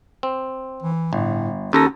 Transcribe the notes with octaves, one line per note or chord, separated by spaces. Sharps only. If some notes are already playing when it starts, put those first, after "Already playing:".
C4
E3
G1 A2
D#2 C#4 A4 A#5